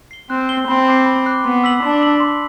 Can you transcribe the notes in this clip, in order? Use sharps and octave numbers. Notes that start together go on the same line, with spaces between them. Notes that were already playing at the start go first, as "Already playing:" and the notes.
C7 G7
C4 F#6
C7 G7
C4 B5
D6 F#6 C7
B5
D6 F#6 C7
B3 C6
E6 B6 F#7
D4 C6
E6 B6 F#7
C6